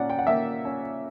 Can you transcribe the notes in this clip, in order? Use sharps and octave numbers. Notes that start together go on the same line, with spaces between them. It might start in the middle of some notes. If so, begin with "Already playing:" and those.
Already playing: A#2 C#4 D5 F#5
G5
F#5
A#3 E5 G5
C#4